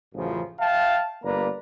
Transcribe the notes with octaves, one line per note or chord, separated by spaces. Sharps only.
A1 F#2 C#3 F3
E5 F5 G5 A5
G1 A#3 B4 D5 A#5